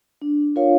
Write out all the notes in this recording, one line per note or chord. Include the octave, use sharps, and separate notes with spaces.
D4
F4 A#4 C#5 F5